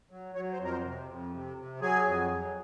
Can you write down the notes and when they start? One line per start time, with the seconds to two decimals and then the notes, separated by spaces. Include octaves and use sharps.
0.11 F#3
0.35 F#3 C#5
0.53 C5
0.59 F2
0.65 A#4
0.72 C5
0.84 C3
1.09 F2
1.33 C3
1.57 C3
1.81 F#3 G#4
2.06 F2
2.30 F#3